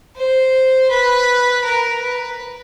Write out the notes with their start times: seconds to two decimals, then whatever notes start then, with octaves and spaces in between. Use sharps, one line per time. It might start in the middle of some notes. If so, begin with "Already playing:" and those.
0.16 C5
0.91 B4
1.65 A#4
2.02 B4